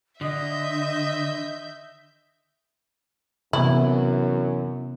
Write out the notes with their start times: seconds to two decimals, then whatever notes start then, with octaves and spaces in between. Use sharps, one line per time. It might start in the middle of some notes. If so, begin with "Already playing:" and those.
0.21 D3 D#5 E5 D#6 G6
3.53 F#2 C3 E3 B3 E4